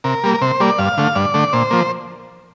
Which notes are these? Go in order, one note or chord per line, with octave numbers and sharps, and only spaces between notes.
C3 A#4
G3 A#3
A#4
C3 C5
G3 A#3 D5
G2 F5
D3 A3
G2 D5
D3 A3
A#2 C5
F3 A#3